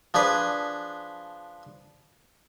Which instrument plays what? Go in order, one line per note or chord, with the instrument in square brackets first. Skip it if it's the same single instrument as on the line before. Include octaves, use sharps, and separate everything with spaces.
[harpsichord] F3 D4 G#4 B4